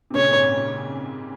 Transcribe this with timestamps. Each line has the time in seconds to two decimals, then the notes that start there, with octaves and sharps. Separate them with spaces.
0.10 C3
0.14 A#2 C#3 C#5
0.31 G#2 C3
0.48 A#2